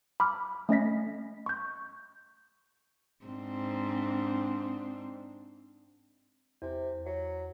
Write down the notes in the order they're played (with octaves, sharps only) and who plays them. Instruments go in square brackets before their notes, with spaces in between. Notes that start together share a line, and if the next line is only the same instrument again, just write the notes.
[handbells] B5 D6 F6
A3 C#4 D#5 A#6 B6
C#6 G6
[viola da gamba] G#2 C4 D4
[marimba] E2 [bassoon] C3
[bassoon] F#3